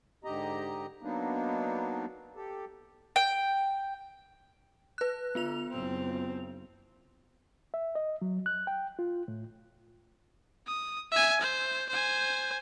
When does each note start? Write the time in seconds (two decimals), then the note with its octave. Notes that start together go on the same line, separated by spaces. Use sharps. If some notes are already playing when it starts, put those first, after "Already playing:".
0.24 G#2 D3 G4 D#5 A#5
1.02 F#3 A#3 B3 D4 D#4
2.36 G4 A4
3.16 G5
4.98 B4 F#6
5.35 D3 B3 F4 F7
5.69 F#1 C4
7.74 E5
7.95 D#5
8.22 F#3
8.46 F#6
8.67 G5
8.99 F4
9.28 A2
10.67 D#6
11.12 E5 G#5
11.41 C5
11.89 C5 G#5